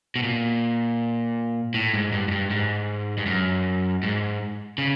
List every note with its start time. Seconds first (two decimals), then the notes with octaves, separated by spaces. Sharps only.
0.16 B2
0.23 A#2
1.74 A2
1.94 G#2
2.12 G2
2.28 G#2
2.31 G2
2.50 G#2
3.18 G2
3.26 F#2
4.03 G#2
4.78 C#3